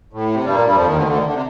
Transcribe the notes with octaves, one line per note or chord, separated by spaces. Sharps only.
A2
C3
G2 G3
A#2 A#3
G2 G3
F2 F3
D#2 D#3
D2 D3
D#3
D2 D3
D#3
D3
C3